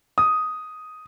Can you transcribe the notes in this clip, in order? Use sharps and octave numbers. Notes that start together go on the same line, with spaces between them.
D#6